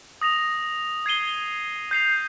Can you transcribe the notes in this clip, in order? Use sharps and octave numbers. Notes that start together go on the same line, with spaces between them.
D#6 A#6 F7
G#6 C7 D#7 G7
G6 C7 F7